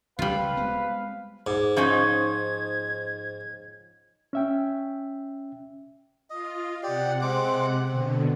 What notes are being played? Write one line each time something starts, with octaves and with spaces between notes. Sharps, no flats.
C#2 C#3 G3 F4 B4 F5
G#3 B3 C4
G#2 D6
F3 C#4 D#4 G#6
C#4 E5 G5
F4 D#5
C3 G4 D5 F#5
G#3 C4 D6
B2 D3 C4